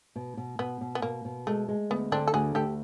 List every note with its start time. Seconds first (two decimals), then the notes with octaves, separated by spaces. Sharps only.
0.16 B2
0.37 B2
0.59 B2 B3
0.81 B2
0.95 B3
1.02 B2 A#3
1.25 B2
1.47 G#3 A3
1.68 G#3
1.90 D2 B3
2.11 D3 C4 D4
2.27 A4
2.34 D2 F#4 G#4
2.55 D2 G4 A4